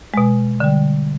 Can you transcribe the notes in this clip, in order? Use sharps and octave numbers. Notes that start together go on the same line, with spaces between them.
B2 G#3
D3 G3